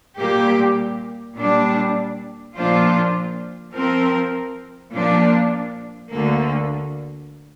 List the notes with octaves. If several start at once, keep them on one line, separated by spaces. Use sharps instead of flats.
A#2 G3 A#3 G4
A#2 G3 D4
A#2 F3 D4 F4 C5
F3 C4 A#4
A#2 F3 A#3 D4
D2 D3 A#3